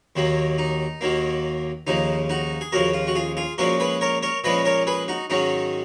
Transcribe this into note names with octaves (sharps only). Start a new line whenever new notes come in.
D#2 D#3 F#3 A#3
D#4
D#2 D#3 F#3 A#3
D#2 C#3 F3 D#4
D#4 F#4
G#4
D#2 C#3 F3 F#4 A#4
F4
F#4
F4 G#4
F4 G#4
A#2 F3 G#3 C#4 F#4 A#4
G#4 B4
A#4 C#5
A#4 C#5
A#2 F3 G#3 C#4 B4 D#5
A#4 C#5
G#4 B4
D#4 F#4
G#2 D#3 F#3 C#4 D#4